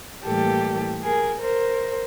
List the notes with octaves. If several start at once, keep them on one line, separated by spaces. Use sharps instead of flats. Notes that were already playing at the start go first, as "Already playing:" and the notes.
A2 E3 G3 A#3 G4 A4
G#4 A#4
A#4 C5